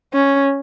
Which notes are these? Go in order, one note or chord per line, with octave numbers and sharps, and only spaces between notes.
C#4